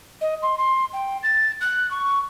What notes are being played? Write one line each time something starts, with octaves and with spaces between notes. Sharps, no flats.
D#5
C6
C6
G5
A6
F#6
C#6